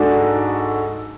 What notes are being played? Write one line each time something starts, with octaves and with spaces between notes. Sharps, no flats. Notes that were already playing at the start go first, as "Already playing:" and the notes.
Already playing: G#2 G#3 D4 F#4 A4